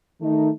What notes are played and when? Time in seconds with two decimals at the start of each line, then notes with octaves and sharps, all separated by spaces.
0.21 D#3 A3 D#4